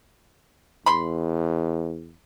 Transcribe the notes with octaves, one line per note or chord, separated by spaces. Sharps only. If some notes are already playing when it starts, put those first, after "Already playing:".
E2 B5 C6